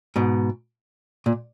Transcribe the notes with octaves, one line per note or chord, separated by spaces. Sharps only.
G#2 B2
A#2